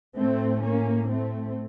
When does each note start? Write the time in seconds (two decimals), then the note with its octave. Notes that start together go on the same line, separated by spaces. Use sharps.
0.16 A2 A3 C4
0.63 A#3 C#4
1.10 A3 C4